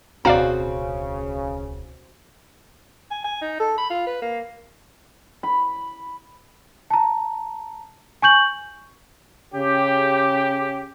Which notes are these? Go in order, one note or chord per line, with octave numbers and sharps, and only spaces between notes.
D1 B1 C#3 C4 F#4 D5 F5 A#5
G#5
G#5
D#4
A4
B5
F4
B4
A#3
B5
A5 A#5
G#5 C#6 G6 F#7
C#3 G4